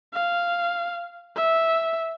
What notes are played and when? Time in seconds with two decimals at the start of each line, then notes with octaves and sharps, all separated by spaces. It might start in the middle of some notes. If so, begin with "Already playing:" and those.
0.13 F5
1.36 E5